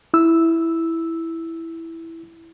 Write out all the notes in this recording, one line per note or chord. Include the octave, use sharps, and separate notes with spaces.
E4 E6